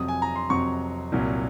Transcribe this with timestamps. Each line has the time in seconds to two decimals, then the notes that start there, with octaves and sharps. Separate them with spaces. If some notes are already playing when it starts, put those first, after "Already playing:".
Already playing: F2 C3 F#3 D#6
0.08 G#5
0.22 A#5
0.36 C6
0.50 F2 C3 F#3 C#6
1.12 C2 A#2 F#3